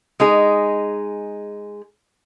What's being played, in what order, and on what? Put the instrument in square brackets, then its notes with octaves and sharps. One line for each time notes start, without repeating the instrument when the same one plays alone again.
[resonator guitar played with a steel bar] G#3 D#4 G#4